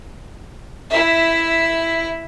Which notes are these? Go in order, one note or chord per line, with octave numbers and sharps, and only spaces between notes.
E4 E5